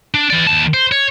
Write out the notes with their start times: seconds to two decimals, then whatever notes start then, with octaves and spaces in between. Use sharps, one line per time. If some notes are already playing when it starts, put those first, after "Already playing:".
0.14 D4
0.30 E3 D5
0.47 D#2 A5
0.74 C5
0.92 C#5